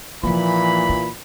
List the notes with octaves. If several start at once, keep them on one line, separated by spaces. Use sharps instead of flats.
A#2 E3 F3 A#3 B5
F4